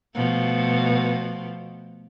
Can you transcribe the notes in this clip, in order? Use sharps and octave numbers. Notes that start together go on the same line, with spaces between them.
B2 F3 A3